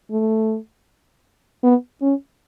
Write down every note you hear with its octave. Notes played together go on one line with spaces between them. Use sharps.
A3
B3
C#4